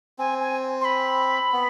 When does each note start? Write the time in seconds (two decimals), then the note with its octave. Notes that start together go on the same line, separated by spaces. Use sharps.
0.18 C4 G#5
0.40 G#5
0.81 C6
0.85 B5
1.53 B3